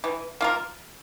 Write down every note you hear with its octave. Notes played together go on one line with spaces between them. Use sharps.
E3
A#3 F4 A#4